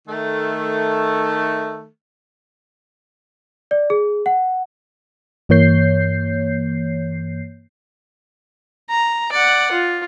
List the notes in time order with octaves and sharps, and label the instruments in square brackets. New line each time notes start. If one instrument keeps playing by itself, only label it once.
[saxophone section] D#3 A3
[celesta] D5
G#4
F#5
[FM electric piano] G2 E3 A#3 C#5 G6 C7
[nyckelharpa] A#5
D5 F#5
F4